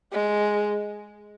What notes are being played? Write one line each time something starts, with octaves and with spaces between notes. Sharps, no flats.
G#3